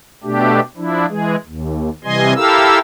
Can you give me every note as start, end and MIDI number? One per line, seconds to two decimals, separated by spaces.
0.24 0.60 47
0.24 0.60 57
0.24 0.60 62
0.24 0.60 67
0.77 1.06 53
0.77 1.06 62
0.77 1.06 64
1.09 1.36 52
1.09 1.36 56
1.09 1.36 68
1.46 1.90 39
2.04 2.34 48
2.04 2.34 52
2.04 2.34 55
2.04 2.34 75
2.04 2.34 80
2.04 2.34 84
2.36 2.79 64
2.36 2.79 67
2.36 2.79 69
2.36 2.79 70
2.36 2.79 77
2.36 2.79 88